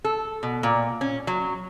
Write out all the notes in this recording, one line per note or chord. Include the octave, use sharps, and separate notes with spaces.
A4
B2
A#2
C#4
F#3